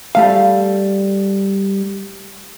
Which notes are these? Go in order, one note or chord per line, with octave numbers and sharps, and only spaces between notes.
G3 A3 F5